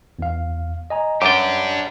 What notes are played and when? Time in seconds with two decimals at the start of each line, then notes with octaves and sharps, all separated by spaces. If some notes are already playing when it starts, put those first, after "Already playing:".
0.19 E2 F5
0.90 D#5 G#5 A#5
1.22 F#2 D4 G4 G5 D6 A6